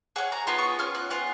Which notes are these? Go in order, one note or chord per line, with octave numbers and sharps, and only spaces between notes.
C#4 G#4 F#5
A#5
B3 F4 G#4 B5
C#6
C#4 F4 F6
F#6
B3 F4 G#4 F#6